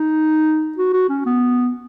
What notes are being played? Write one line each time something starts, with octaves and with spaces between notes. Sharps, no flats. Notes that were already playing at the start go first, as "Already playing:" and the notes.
Already playing: D#4
F#4
F#4
C#4
B3